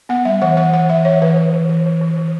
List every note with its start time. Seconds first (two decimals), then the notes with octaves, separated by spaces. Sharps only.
0.09 B3 F#5
0.25 G3 E5
0.42 E3 F#5
0.57 E3 F#5
0.73 E3 F#5
0.89 E3 E5
1.05 E3 C#5
1.22 E3 B4
1.37 E3
1.53 E3
1.69 E3
1.86 E3
2.01 E3
2.18 E3